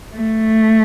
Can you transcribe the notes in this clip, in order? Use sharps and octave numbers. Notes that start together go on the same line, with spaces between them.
A3